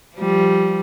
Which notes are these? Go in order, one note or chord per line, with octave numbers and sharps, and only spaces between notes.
F3 G3